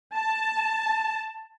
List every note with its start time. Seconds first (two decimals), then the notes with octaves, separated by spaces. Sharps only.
0.16 A5